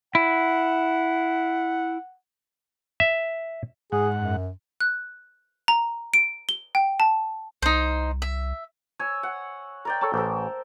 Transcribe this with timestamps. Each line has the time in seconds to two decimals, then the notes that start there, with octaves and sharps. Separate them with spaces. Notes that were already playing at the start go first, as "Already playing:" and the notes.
0.15 E4 F#5
3.00 E5
3.92 G#2 G#4 F#5
4.16 F#2
4.80 F#6
5.68 A#5
6.14 D7
6.49 G7
6.75 G5
7.00 A5
7.62 C2 D#4 C5
8.22 E5
8.99 C#5 G#5 E6
9.23 F#5
9.85 A#4 D5 G5
10.01 A4 C#5 A5
10.14 A1 A4 A#4 C5